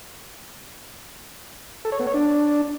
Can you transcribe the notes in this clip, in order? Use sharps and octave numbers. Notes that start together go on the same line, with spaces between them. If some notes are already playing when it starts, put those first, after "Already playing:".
A4
C#5
B3
C#5
D4